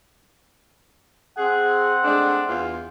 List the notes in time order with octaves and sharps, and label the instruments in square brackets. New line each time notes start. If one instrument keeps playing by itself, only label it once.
[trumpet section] C4 F#5 [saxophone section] G#4
[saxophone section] G#3 A3 D4
E2 F4